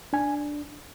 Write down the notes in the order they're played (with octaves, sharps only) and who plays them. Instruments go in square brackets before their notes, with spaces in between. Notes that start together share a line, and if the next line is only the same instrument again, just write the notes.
[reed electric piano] D4 G#5